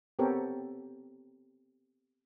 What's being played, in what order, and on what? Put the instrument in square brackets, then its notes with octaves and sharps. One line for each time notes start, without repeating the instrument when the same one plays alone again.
[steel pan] B3 C4 G4 A4 A#4 C#5